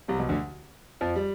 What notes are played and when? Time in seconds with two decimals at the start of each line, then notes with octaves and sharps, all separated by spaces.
0.08 C2 C3
0.19 B1 B2
0.29 D2 D3
1.01 F2 F3
1.16 G3